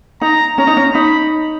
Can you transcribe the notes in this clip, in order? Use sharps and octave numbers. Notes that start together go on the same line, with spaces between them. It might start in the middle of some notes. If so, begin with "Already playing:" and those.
D#4 A#5
C#4 A#5
D#4
C#4
D#4 B5